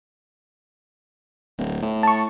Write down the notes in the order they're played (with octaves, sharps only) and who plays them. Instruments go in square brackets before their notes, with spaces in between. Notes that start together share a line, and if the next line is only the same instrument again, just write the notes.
[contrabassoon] D1
A2
[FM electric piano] A5 C#6